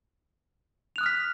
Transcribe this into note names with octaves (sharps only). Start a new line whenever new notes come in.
D#6 F6 F#6 B6 F7